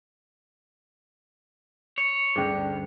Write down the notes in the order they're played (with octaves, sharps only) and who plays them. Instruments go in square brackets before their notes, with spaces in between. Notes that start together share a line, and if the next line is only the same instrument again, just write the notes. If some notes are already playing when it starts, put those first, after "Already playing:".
[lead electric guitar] C#5
[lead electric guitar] D2 G2 [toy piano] C#4 G#4